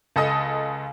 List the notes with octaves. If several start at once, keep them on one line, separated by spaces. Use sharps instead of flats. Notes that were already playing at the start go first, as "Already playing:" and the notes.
C#2 A4 D#5 D#6